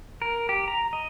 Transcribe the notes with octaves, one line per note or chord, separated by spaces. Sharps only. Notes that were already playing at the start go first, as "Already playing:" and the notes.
A#4
G4
A#5
D#5